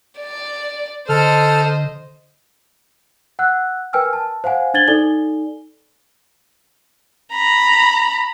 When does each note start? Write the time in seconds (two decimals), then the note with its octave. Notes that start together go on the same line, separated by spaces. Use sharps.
0.19 D5
1.09 D3 A4 C5 D#5 F6
3.39 F#5 E6 F#6
3.93 A#4 B4 G5 G#5 E6 F6
4.13 A5
4.44 C5 F5 F#5 G#5
4.74 D4 C5 G#6 A6 F#7 G7
4.88 D#4 A4 D5 G#5 G7
7.33 A#5 B5